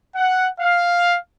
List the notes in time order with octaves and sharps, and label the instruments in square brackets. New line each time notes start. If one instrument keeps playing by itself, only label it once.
[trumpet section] F#5
F5